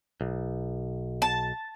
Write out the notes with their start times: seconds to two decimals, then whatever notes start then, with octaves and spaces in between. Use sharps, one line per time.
0.21 B1
1.22 A5